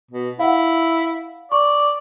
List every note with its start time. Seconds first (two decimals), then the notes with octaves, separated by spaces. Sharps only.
0.11 B2
0.39 E4 F5 F#5
1.52 D5 C#6